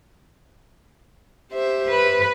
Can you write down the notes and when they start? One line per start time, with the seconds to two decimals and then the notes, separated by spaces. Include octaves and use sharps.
1.51 G4 C5 E5
1.89 B4